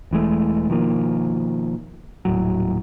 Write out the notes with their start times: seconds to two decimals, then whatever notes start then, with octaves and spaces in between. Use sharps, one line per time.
0.11 E1 E3 G#3 A3
0.68 B2 D#3 F3 A#3
2.25 D#1 A2 F#3